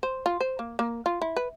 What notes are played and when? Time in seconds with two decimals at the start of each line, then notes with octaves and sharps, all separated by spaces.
0.03 C5
0.26 F4
0.41 C5
0.59 A#3
0.79 A#3
1.06 F4
1.22 E4
1.37 B4